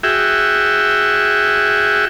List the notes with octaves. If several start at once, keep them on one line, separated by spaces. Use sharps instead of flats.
F#4 G#4 E5 G5